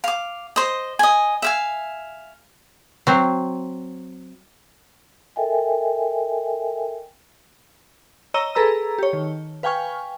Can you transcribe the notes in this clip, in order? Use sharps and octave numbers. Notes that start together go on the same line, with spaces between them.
F5 D6
C5 D#5
D#5 G#5
E5 F5 G#5
F#3 C4
A4 A#4 D#5 E5 G5 G#5
C#5 D#5 A#5 E6 D#7 G7
G#4 A4 B4 A#5 E6
G4 C#5
D#3
B4 F5 G5 G#5 C#6 F6